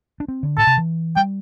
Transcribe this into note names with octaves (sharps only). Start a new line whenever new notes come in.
D4
C4
D3
A2 A5
C3
E3
G3 G5